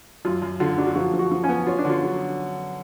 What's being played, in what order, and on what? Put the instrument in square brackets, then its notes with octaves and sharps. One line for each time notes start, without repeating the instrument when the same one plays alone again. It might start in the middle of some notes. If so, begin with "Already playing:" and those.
[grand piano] F#2 [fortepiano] F4
[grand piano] F#2
[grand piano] D3 [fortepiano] F4
[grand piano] F#3 [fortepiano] D4
[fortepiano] F4
[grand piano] F3 [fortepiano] F#4
[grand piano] F3
[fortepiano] F#4
[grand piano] F3
[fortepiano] C#4
[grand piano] B3
[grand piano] C#4 [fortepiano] F4
[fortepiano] D4
[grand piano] D3 [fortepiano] F4
[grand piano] F#3